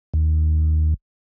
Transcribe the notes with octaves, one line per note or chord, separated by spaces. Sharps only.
D#2